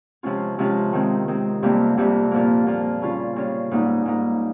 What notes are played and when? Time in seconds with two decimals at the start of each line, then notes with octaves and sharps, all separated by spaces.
0.23 C3 F3 G#3 C#4 F4
0.59 C3 F3 G#3 C#4 F4
0.93 D#3 G#3 C4
1.28 D#3 G#3 C4
1.62 F2 C3 G3 A#3
1.97 F2 C3 G3 A#3
2.31 A#2 F3 A#3
2.67 A#2 F3 A#3
3.02 C#3 G3 C#4 F4
3.36 C#3 G3 C#4 F4
3.71 G#2 G3 A#3 D#4
4.06 G#2 G3 A#3 D#4